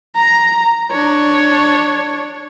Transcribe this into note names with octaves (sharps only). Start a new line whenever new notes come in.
A#5
D4 C#5